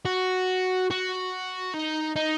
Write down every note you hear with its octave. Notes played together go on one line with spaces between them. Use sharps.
F#4
F#4
D#4
D#4